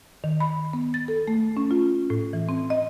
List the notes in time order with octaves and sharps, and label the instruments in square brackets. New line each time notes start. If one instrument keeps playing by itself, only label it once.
[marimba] D#3
B5
B3
A6
A4
A3
C#4
F4
A2
E3
C4
D#5